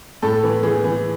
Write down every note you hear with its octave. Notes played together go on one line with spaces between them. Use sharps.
A2 A4
E3
E3 G#4
E3